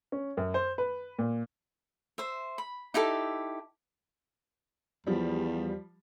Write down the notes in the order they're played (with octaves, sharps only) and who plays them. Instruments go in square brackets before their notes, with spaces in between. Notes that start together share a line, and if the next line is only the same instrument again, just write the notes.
[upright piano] C#4
F#2
C5
B4
A#2
[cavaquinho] C5 E5
B5
D#4 E4 G4 A4
[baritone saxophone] E2 [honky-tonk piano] F3 G3